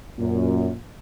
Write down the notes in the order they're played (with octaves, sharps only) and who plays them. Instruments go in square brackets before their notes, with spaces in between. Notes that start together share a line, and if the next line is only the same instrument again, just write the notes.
[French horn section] F#2 [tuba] A#2